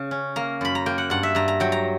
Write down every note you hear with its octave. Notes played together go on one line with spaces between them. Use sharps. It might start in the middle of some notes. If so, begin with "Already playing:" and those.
Already playing: C#3
C#4
A#3 A#5
F#2 B5
A#5
A#3 G5
F#5
G2 F#5
E5
G2 A#5
A#5
F#3 G5
A#5